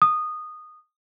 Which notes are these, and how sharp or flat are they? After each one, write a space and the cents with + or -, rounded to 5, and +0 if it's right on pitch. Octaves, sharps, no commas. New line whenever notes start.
D#6 -15